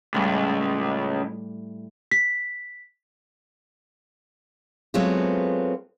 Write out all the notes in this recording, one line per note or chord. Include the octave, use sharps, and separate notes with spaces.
C#2 A2 G3
B6
F#3 G#3 A3 B3 C4 F4